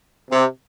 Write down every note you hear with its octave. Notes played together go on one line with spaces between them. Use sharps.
C3